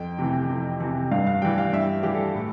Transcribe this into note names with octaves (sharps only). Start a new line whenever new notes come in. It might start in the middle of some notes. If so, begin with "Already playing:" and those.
Already playing: F2 G5
C3 E3
F2
C3 E3
G2 F5
F5
E3 G3 G5
F5
G2 E5
E3 G3 G4
A4
A2